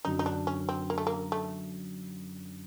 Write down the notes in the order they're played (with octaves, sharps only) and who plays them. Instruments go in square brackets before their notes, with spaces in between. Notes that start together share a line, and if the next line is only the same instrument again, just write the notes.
[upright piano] F#2 D3 F#3 [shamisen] D#4
[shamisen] D#4
D4
C#4
C4
A#3
A3
A#3
A3